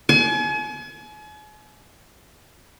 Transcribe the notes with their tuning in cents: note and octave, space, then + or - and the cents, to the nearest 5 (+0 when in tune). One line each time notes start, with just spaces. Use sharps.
G#5 +40